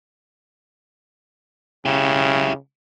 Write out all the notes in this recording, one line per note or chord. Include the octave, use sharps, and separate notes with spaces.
C#3 E4 G4